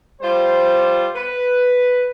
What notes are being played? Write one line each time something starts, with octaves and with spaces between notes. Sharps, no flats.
G3 F4 C5
B4